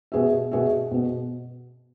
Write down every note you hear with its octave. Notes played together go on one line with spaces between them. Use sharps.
B2 B3 G#4 E5
B2 B3 G#4 E5
B2 B3